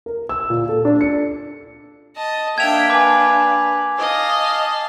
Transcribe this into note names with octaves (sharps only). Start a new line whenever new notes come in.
A#4
E6
A#2
A4
D4
C#7
D#5 A5
A#3 D4 E5 G5 G#6 F7
B4 G#5 D6
D#5 F5 A5